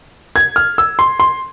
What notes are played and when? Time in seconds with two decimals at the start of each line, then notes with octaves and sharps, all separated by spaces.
0.36 G#6
0.56 F6
0.78 E6
0.99 C6
1.20 C6